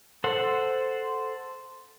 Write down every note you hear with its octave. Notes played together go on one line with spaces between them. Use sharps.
A4 C5 F#5